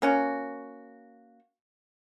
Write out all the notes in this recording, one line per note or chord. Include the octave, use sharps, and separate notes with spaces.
A#3 C#4 F#4